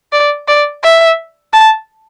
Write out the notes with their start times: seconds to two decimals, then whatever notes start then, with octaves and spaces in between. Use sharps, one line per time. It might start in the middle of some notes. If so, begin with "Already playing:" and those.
0.12 D5
0.48 D5
0.83 E5
1.53 A5